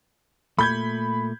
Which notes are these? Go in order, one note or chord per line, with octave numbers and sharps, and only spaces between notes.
A#2 A3 B5 G6 G#6